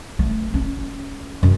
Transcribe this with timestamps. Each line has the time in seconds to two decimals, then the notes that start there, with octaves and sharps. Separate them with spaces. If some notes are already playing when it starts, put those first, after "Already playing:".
0.19 A3
0.54 C#4
1.43 F#2